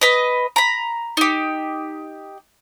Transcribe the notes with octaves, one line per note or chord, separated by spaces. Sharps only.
B4 D#5
A#5 B5
D#4 G4